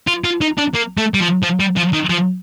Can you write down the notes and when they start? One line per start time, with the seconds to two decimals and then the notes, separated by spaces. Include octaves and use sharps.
0.08 F4
0.25 F4
0.42 D#4
0.58 D4
0.74 A#3
0.98 A3
1.14 G3
1.20 F3
1.43 F3
1.60 G3
1.77 F3
1.93 D#3
2.10 F3